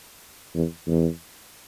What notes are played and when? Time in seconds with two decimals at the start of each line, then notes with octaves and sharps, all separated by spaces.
0.55 E2
0.87 E2